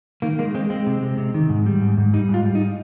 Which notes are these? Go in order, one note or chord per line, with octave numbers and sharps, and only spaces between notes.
D#3 A#3
G#3 A#3
G#3 C4
G#3 C4
C3
G#3
C3
D#3
G#2
G3
G#2
G#2
G3 D#4
G#2
F4
G3
D#4